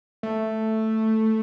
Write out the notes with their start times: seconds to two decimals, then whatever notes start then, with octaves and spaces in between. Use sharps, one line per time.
0.23 A3